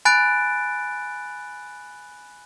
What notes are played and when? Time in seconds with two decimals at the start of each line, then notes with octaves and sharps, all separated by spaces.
0.05 G#5 B5 F#6 A6 D7